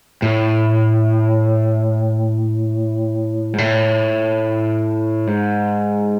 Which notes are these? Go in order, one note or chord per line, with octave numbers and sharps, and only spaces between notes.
A2
G#2
A2
G#2